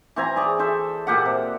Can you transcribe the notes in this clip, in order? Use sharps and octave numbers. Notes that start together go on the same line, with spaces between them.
E3 C4 G#5 A#5
G#4 D5 C#6
A4 C5 E5
A#2 G4 F#5
C3